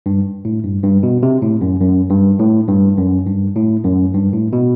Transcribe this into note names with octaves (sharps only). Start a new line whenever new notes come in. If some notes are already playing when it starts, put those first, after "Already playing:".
G2
A2
G2
G2
B2
C3
A2
F#2
F#2
G2
A2
G2
F#2
G2
A2
F#2
G2
A2
B2